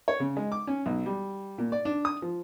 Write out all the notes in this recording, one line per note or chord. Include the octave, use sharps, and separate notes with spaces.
C#5
C#3
G#3
D6
C#4
B1
G3
A#2
D5
D4
D#6
F3